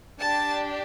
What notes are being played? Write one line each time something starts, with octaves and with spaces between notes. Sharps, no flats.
D4 G4 A5